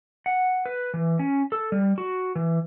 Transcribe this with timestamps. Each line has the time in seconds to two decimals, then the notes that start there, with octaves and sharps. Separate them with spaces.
0.26 F#5
0.66 B4
0.94 E3
1.19 C#4
1.52 A4
1.72 G3
1.98 F#4
2.35 E3